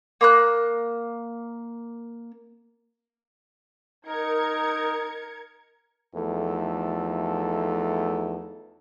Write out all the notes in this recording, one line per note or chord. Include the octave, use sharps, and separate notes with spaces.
A#3 B5 F#6
D#4 A#4 G#6 C#7
E2 F3 A3 D#4 A4